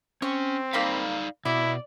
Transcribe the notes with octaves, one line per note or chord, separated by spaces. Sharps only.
C4 C#4 C#6
A#3 D#4 D5 F5 B5
B2 E4 D5